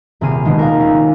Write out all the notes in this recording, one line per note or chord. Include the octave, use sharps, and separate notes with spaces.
D#1 C3 C4 G#4 F6 D#7
B2 D#3 G#3
A#4 F5
C#4